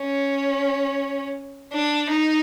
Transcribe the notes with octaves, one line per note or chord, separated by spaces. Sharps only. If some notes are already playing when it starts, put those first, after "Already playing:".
Already playing: C#4
D4
D#4